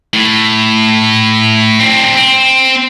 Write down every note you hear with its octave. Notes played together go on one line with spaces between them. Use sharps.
A2
C4 D4
C4